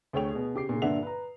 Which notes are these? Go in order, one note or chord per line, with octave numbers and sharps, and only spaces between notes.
D2 A3 G#4 C#5 G5 F7
B2 G#4
C#3 G4 D6 C7
A#2 C#3
G2 A#2 D3 E5 F#5 F7
B4 A#5